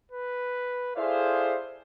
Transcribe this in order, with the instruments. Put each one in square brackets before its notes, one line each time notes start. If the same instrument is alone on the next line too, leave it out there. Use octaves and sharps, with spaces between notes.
[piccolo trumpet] B4
[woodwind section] E4 E5 F5 [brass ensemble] G#4 A4 C5 [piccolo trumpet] D5